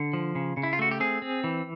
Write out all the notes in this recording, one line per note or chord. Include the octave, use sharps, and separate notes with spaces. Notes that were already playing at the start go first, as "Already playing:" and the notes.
Already playing: D3
F3
C#3
C#3
E4
F4
A3 F#4
G4
C4 G#4
C4
E3